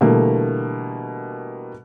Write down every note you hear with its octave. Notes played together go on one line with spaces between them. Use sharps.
B2 D3 E3 G3 A3 A#3